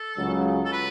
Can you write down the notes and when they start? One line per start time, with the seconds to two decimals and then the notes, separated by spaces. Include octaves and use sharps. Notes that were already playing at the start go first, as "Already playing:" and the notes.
Already playing: A4
0.17 C#2 C#3 F#3
0.65 A4
0.72 B4